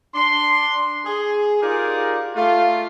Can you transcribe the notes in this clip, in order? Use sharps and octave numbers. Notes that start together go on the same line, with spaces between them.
D4 C6
G#4
D#4 F4 G4 G#4 A#4 D5
A3 F4